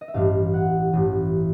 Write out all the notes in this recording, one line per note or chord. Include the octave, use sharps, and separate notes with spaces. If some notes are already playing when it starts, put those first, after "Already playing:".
D#5
E5
A1 G2 E3 F5
F#5
A1 G2 E3